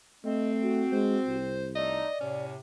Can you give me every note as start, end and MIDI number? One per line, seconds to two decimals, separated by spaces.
0.25 0.85 57
0.25 1.58 60
0.25 0.50 75
0.63 1.36 66
0.92 1.18 56
0.92 1.69 72
1.26 2.07 36
1.75 2.06 57
1.75 2.06 63
1.75 2.45 74
1.75 2.17 75
2.21 2.58 45
2.21 2.58 48
2.21 2.53 61